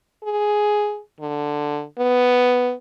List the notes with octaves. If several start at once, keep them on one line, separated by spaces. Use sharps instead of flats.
G#4
D3
B3